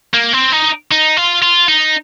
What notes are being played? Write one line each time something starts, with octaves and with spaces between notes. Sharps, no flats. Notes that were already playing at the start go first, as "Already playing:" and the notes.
A#3
C4
D#4
D#4
F4
F4
D#4